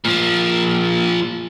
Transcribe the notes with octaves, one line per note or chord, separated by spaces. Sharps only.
A#2 F3